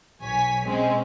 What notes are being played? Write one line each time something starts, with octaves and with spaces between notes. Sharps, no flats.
B1 C#5 G#5 B6
B2 G#3 C4 C#4